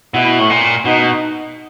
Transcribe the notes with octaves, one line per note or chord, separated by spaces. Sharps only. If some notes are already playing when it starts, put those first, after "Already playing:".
B2 E4
A2
A#2
B2 D#4